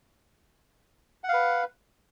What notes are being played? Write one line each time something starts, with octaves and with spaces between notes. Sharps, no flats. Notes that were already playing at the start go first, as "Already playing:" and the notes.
B4 F5 F#5